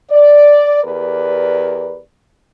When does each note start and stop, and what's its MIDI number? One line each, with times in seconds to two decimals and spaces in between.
0.11 0.82 74
0.84 2.00 40
0.84 2.00 67
0.84 2.00 70
0.84 2.00 71
0.84 2.00 74